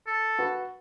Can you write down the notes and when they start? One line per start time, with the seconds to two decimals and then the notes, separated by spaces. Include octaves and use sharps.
0.07 A4
0.39 F#4 B4